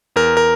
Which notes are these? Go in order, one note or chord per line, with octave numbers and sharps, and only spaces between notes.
E2 A#4
A#4